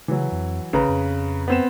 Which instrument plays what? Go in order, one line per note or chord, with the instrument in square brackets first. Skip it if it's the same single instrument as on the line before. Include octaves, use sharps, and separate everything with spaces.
[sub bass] C#3 [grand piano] E3 F#3
[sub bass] F2
[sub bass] A1 [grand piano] C#3 B4 A#5
[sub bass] F2
[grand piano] B3 C4 E7